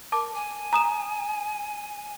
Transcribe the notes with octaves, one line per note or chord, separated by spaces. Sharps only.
A#4 A5 D6
G#5
A#5 D#6 E7